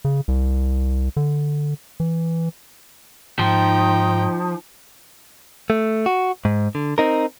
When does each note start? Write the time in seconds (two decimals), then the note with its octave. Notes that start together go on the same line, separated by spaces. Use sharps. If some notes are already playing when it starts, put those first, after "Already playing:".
0.05 C#3
0.28 C2
1.17 D3
2.00 E3
3.39 G#2 F3 D#4 G5
5.70 A3
6.06 F#4
6.45 G#2
6.75 D3
6.98 C4 D#4 A#4